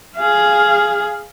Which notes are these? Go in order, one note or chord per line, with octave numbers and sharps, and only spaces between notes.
G#4 F5